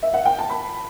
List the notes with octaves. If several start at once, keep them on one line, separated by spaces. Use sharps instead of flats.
E5
F#5
G5
A5
B5